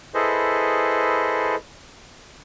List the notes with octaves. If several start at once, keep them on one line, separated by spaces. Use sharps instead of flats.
E4 G#4 A4 B4 C5 D#5